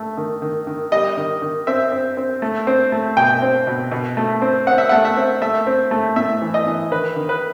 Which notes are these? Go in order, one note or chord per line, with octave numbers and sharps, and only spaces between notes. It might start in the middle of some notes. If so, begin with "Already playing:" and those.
Already playing: A3
D#3
D#3
D#3
G3 D#5
D#3
D#3
C4 E5
C4
C4
A3
C4
A3
B2 G5
C4
B2
B2
A3
C4
C4 F#5
E5
A3 F#5
E5
C4
A3 E5
C4
A3
A2 E5
E3
D#5
E3
D#3 B4
D#3
B4